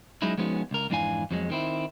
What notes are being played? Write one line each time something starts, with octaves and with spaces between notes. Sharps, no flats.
F#3 G#3 C#4 D#4 E4
F3 G#3 B3 C#4 D#4 F#4
C#2 A#4
F2 G#2 E3 D4 F5 G#5
F2 F#3 G#3
D#3 C4 E4